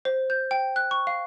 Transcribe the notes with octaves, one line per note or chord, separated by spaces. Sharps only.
C5
G6
G5
F#6
C#6
F5